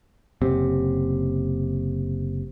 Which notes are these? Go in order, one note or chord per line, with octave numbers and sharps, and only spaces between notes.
F#1 C3